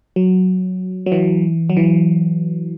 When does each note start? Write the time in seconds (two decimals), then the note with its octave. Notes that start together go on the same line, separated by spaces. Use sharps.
0.16 F#3
1.06 F#3
1.12 E3
1.70 F#3
1.77 E3